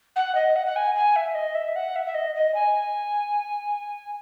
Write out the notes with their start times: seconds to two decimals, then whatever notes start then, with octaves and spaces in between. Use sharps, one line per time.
0.16 F#5
0.35 D#5
0.56 F#5
0.66 F#5
0.76 G#5
0.95 G#5
1.16 E5
1.35 D#5
1.55 E5
1.76 F#5
1.96 E5
2.06 E5
2.14 D#5
2.36 D#5
2.54 G#5